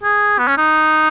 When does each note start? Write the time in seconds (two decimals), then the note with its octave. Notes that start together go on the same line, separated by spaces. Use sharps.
0.03 G#4
0.38 B3
0.48 C#4
0.57 D#4